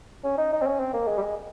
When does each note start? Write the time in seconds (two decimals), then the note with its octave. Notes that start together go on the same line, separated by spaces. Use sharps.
0.24 C#4
0.38 D#4
0.52 D#4
0.62 C4
0.67 C#4
0.80 C4
0.94 A#3
1.08 G#3
1.18 G3
1.22 G#3